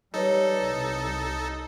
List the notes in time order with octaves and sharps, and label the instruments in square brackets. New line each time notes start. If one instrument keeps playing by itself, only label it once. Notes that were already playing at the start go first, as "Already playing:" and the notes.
[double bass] G3 [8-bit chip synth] D#4 A4 [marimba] B4 C#5 D#5
[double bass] C2